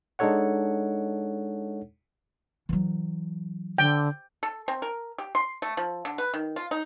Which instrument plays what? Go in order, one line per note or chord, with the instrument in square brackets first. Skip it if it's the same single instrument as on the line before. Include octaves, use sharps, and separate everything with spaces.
[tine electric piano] G#3 D4 D#4 A4 C#5 F#5
[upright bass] E3 F#3
[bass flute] D3 [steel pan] G5
[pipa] A4
C4
A#4
G4
C6
A3
F3
D3
B4
D#3
F4
D#4